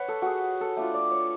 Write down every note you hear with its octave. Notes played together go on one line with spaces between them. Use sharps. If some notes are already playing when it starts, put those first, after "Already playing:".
Already playing: B4 C#5 F#5
A4
F#4 G#4
A4
A3 D4 F4
D5
C#5